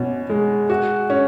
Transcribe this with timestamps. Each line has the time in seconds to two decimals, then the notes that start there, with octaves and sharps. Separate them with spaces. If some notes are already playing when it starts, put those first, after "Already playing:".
Already playing: B2 C#4
0.30 G#3
0.70 F#4
1.10 C#4